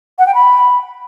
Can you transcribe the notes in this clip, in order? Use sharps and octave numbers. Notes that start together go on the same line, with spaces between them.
F#5
G5
B5